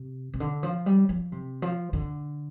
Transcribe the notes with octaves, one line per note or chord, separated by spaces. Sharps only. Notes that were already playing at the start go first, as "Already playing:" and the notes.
Already playing: C3
C3
D3
F3
G3
F3
C3
F3
D3